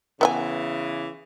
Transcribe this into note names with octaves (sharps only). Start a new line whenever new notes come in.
C#3 E3 B3 E5 G#5